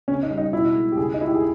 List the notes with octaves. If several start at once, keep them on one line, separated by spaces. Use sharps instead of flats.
C#3 C#4
D#4
G3
D#4
B2 E4
G#3
G4
C#3 G#4
D#4
G#3 E4
G4
G#4